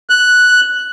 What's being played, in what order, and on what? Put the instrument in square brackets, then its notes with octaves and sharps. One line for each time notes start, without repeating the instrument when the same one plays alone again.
[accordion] F#6